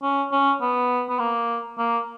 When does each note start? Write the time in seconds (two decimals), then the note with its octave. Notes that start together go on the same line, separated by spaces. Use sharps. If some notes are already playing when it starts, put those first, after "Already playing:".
0.03 C#4
0.32 C#4
0.61 B3
1.09 B3
1.19 A#3
1.78 A#3